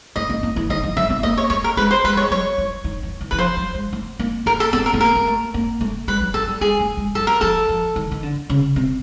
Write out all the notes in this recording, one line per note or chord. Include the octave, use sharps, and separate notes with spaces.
A3 D#5
A#3
A#3
E3
D#3 D#5
F3
F#3 E5
B3
A#3 D#5
C#5
A3 C#5
A#4
G#3 B4
C5
G#3 B4
G3
C#5
G#3
F#3 C#5
E3
D#3
E3
E3
E3 B4
F3 C5
F#3
G#3
A3
A#3
A#3 A#4
A4
B3 A4
A#4
A3
A#3 A#4
A#3
A3
A#3
A3
G3 B4
F#3
F#3 A4
G#3
G3
G#3 G#4
A3
G#3
F#3 A4
A#4
F3 A4
F3
D#3
D#3
D3
C#3
C3